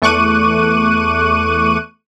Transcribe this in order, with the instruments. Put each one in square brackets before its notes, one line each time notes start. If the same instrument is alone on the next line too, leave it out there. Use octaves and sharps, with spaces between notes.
[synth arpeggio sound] E2 A3 C#6 D6 F#6 D#7